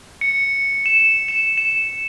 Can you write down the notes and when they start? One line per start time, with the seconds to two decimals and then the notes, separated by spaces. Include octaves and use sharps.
0.21 C#7
0.86 E7
1.28 E7
1.58 E7